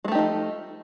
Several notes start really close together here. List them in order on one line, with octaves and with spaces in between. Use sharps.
G#3 A3 G4 D#4 F3